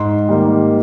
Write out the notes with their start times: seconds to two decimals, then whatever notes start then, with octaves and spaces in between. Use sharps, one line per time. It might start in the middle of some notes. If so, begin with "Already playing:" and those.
Already playing: G#2 C6
0.29 D#3 G3 A#3 D#4